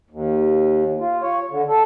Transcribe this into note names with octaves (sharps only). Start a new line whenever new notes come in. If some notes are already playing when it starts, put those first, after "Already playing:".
D#2
F4
C#5
D3
A4